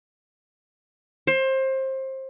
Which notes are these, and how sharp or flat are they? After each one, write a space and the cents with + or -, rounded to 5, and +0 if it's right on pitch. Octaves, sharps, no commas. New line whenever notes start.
C5 +25